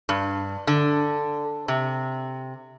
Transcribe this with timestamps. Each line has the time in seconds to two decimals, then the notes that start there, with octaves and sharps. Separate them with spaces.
0.09 G2
0.67 D3
1.68 C3